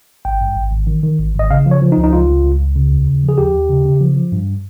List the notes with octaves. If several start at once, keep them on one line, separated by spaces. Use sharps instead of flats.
G#1 G5
G2
G#1
G#1
D#3
D#3
G#1
G#1
D#5
C#3 F5
F3
C#5
F3
D#4
C#2
D#4
C#2 F4
C#2
C#2
C#2
C#3
D#2
C#3
F3
G#4
D#2 G4
D#2
C#3
C#3
F3
F3
G2